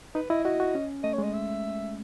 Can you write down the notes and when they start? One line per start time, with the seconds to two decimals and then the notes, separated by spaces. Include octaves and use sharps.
0.15 D#4 B4
0.30 E4 D#5
0.45 F#4 D#5
0.60 F#4
0.75 C#4
1.04 A3 D#5
1.14 C#5
1.18 G#3
1.23 D#5
1.33 E5